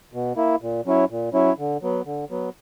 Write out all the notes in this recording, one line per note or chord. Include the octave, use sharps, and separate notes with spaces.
B2
A#3 E4
A#2
F#3 C#4 E4
A#2
F#3 C#4 E4
D3
F#3 B3
D3
F#3 B3